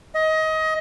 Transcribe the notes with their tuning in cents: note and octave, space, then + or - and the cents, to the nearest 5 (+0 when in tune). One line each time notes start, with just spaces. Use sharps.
D#5 +25